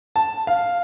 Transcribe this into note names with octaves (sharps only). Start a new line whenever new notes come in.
A5
F5